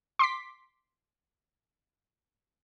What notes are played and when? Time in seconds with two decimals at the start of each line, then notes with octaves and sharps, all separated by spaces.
0.19 C6 D6 B6